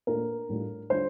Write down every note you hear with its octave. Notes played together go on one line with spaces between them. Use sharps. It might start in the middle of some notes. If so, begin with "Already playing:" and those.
A#2 A3 D4 F4 A#4
A2 G3 D4 F4
D3 G3 D4 F4 C5